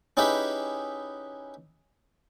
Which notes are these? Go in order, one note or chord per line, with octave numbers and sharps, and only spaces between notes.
C#4 D#4 E4 G4 G#4 B4